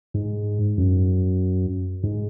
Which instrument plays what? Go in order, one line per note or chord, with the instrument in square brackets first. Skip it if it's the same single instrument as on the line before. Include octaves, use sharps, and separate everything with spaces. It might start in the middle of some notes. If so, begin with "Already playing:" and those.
[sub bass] G#2
F#2
G#2